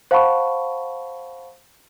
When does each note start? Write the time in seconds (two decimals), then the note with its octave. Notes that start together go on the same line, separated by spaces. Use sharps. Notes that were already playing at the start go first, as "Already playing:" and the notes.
0.11 C5 F5 F#5 A5 B5 C#6